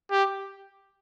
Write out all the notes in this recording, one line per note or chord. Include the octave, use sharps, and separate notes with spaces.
G4